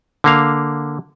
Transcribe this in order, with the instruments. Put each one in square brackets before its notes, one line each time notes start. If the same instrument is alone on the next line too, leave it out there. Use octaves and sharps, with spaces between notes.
[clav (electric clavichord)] D3 A#3 F5